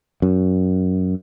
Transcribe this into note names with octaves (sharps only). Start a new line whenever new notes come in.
F#2